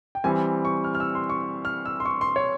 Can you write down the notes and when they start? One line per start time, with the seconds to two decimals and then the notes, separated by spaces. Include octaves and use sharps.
0.15 G5
0.24 E3 G3 C4 G#5
0.65 C#6
0.84 F6
0.95 F6
1.00 E6
1.15 C6
1.30 C#6
1.65 F6
1.85 E6
2.00 C6
2.05 C#6
2.21 C6
2.36 C#5